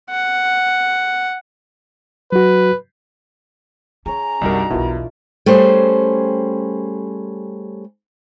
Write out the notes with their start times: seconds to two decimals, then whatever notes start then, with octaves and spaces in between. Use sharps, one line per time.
0.10 F#5
2.32 F#3 F#4 B4
4.06 C#4 G#4 C#5 A#5
4.41 C2 F#2 G3 B3 D4 D#4 F#4 A#4
4.70 E1 B1 B2 E4 F4 A#4
5.46 G3 A3 C#4 G#4 C5